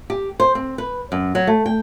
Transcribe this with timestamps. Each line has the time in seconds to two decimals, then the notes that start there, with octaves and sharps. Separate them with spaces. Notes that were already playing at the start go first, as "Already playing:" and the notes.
0.10 G4
0.40 C5
0.55 C4
0.78 B4
1.12 F#2
1.35 F#3
1.47 A3
1.66 G5